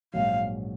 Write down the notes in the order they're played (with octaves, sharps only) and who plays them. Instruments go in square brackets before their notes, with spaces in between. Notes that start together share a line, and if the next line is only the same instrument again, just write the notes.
[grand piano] A#1 G#2 F#3 [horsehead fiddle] F5